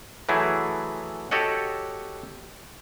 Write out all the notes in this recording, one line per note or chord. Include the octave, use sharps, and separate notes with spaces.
E3 F#3 A3 E4 G#4
F#4 G4 A4 C#5 D#5 F#5